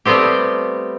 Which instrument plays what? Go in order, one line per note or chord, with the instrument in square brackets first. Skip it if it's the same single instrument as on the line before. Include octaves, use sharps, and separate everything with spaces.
[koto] G3 A3 B3 C4 G4